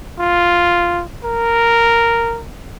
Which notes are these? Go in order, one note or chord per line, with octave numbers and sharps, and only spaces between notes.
F4
A#4